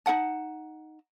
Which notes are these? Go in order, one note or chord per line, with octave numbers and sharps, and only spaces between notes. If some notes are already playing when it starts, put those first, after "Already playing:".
D#4 A#4 F#5 A5